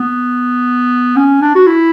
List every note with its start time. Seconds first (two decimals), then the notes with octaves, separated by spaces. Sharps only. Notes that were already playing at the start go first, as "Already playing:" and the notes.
Already playing: B3
1.16 C#4
1.41 D4
1.55 F#4
1.67 E4